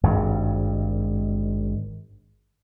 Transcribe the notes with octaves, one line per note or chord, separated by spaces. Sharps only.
G#1 G2